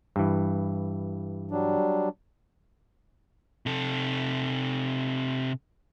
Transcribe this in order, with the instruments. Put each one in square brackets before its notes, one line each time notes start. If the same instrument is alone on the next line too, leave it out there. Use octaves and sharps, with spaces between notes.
[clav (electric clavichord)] G2 E3
[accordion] F#3 G3 D4
[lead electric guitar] C3 A4